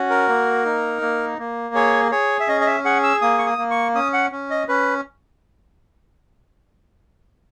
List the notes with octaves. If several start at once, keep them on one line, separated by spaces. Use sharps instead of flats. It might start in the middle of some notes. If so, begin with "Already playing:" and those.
Already playing: C#4 F#4
A#4
A#3
D#4
A#3
A#3
G#4 C#5
G#4 C#5
E5
C#4 D#5
D#5
E5
G#4 F#5
E6
A#3 D#6
C#6
D#6
A#3
C#6
C#4 D#6
F#5
C#4
D#5
C#4 B4